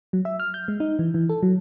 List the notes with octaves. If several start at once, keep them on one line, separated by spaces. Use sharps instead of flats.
F#3
E5
F6
G6
G#3
D#4
E3
E3
A4
F#3